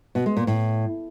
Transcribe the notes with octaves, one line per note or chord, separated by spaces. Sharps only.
B2
G#3
A#2
A2